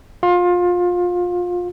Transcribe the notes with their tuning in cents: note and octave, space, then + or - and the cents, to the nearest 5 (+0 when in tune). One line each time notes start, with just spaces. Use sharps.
F4 +25